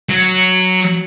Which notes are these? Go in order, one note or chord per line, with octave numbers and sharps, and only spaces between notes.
F#3